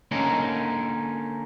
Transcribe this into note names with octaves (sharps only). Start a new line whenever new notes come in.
D3 A#3 C#4 D#4 A#4